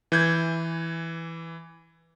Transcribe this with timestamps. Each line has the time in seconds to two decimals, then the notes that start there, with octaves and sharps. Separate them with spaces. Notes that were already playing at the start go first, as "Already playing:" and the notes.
0.12 E3 G6 G#6